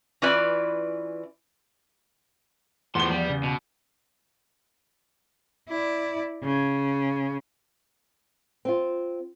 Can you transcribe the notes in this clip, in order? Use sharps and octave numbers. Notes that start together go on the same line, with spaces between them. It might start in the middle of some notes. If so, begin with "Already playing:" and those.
E3 C#4 E4 F4 B4 D5
E2 A2 F3 C6 G7
F3 G3 B3
C#3
B2
E4 D5
C#3
C4 F4